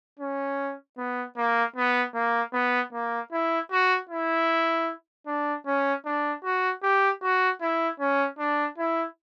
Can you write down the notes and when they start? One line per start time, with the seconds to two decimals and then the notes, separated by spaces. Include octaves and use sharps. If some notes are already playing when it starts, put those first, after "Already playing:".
0.20 C#4
0.98 B3
1.37 A#3
1.76 B3
2.14 A#3
2.53 B3
2.93 A#3
3.32 E4
3.71 F#4
4.09 E4
5.27 D4
5.66 C#4
6.05 D4
6.44 F#4
6.83 G4
7.22 F#4
7.61 E4
8.00 C#4
8.39 D4
8.78 E4